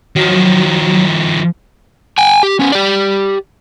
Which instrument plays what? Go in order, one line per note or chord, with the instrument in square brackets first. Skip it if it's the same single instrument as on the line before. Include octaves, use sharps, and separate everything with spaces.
[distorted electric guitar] D#3 F3 [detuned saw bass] F#3
[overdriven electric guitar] G5 G#5
G4
B3 C#4
G4 D5